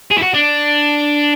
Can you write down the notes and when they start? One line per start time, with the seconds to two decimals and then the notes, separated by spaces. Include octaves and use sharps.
0.11 G#4
0.18 E4
0.23 F#4
0.34 D4